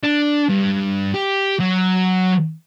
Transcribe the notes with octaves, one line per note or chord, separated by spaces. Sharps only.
D4
G2
G4
F#3